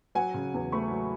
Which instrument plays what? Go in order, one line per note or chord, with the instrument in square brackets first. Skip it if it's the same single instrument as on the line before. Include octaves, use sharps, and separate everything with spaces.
[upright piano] F#3 F#5 G#5
C#3
E2
A3 B5 C#6
F#3